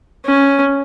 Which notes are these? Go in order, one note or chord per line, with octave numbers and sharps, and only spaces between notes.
C#4